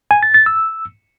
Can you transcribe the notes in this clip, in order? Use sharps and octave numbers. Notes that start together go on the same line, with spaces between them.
G#5
A6
A6
E6